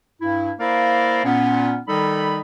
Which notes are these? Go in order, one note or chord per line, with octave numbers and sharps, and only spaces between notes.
G2 E4
A#3 E4 A#4 C5 D5 F5
A#2 B3 C#4
D#3 G3 D#4 A4 B5